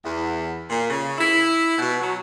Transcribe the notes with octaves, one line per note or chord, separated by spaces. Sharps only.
E2
A#2
C#3
E4
B2
F#3